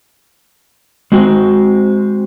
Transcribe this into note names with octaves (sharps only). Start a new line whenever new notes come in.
G#3 C4 F#4